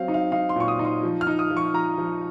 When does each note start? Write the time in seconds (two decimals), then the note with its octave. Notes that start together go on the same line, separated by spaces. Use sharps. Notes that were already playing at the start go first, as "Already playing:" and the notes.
Already playing: F#3 C4 F5
0.08 D#4
0.14 F5
0.32 D#4 F5
0.49 C6
0.56 A#2 C#6
0.68 D#6
0.79 D#4
0.85 C6
1.03 F3
1.21 F6
1.27 D#4
1.39 D#6
1.51 F3
1.57 C#6
1.74 F3 A#5
1.98 F3